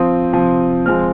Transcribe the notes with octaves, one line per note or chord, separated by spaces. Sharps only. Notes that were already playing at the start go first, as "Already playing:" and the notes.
Already playing: F3 C4 D#6
C3 F3 C4
F3 G#3 C4 F6